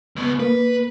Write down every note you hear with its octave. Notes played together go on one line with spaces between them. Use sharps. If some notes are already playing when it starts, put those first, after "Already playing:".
C#2 B3
A#3 B4